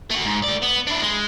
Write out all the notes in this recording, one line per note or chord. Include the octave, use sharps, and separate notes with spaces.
A3 F#4
G#2
A3 D5
B3
D4 E4
G#3